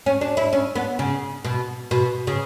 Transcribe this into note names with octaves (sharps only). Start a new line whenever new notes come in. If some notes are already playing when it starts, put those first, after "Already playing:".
C#4
D4
E4
C#4
B3
C#3
B2
B2
C#3